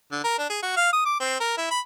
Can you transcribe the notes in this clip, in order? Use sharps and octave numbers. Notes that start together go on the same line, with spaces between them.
D3
A#4
D4
G#4
F#4
F5
D#6
D6
C4
A#4
E4
B5